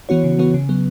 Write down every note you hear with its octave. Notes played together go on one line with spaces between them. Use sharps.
E3 B3 F#4 C#5
C#3
E3 B3 F#4 C#5
C#3
F#3 B3